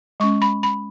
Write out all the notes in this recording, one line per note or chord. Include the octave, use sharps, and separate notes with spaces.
G#3 C#4 C#6
B5
B5